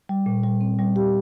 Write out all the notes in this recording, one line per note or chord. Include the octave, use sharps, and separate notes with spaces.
G3
A#2
G3
C4
G3
G4